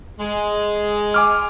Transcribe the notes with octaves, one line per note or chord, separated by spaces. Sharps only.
G#3
G#5 D6 F6